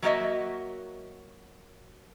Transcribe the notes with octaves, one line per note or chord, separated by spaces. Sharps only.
F#3 A3 A#3 F#4 D#5 E5